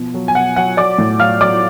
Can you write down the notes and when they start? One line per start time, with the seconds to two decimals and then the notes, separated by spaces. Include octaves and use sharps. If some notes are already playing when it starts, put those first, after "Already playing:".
Already playing: B2 F3
0.14 F#3
0.28 G#5
0.35 B2 F#5
0.56 F#3 F#5
0.77 F#3 D5 D6
0.98 A2
1.20 F#3 F5 F6
1.41 F#3 D5 D6